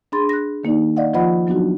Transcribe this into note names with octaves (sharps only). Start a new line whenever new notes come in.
D4 G#4 B5 C6 A6
F#6 A#6
D#3 A#3 D#4 D5
D5 D#5 F5 F#5
F3 F4 C5 D#5 F#5 B5
F#3 B3 D4 D#4 F#4